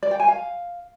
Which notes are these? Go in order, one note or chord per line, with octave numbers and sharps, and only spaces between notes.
D5
G5
G#5
F5